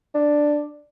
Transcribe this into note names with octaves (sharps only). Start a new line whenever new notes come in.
D4